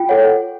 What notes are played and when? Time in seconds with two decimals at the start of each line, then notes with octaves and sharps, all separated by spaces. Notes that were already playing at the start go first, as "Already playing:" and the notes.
Already playing: F4 G5
0.09 A4 C#5 F#5